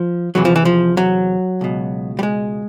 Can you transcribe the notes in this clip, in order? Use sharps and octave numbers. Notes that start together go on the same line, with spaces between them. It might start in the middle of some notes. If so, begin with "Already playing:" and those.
Already playing: F3
E2 C3 E3 F#3
F3
E3
F3
F#3
C#2 B2
G3
G#3